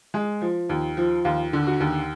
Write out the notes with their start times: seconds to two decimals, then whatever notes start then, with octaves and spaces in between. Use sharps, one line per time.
0.14 G#3
0.41 F3
0.69 D#2
0.97 F3
1.25 D#2 F4
1.53 D3
1.67 F#4
1.80 D#2